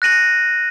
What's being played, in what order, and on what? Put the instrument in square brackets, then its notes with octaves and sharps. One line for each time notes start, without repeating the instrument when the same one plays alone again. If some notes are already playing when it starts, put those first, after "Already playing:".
[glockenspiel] F#6 A#6 D#7 F#7